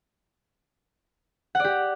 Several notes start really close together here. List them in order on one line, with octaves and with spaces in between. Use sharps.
F#5 D5 G4